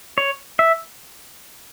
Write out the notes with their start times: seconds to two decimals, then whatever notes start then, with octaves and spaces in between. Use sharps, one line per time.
0.18 C#5
0.59 E5